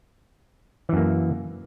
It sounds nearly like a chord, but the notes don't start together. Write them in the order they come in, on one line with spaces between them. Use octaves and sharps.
E3 F#2 A#3